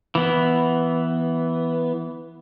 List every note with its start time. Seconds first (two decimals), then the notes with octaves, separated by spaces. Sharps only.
0.15 E3 B3